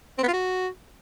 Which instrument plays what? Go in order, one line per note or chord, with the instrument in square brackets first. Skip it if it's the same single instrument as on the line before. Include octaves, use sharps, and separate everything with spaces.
[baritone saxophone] C4
B3
F4
F#4